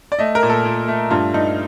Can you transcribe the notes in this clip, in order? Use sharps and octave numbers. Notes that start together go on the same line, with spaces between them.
D5
A3 D#5
A#4
A#2
A4
A#2
A3
G2 F4
G2 D#4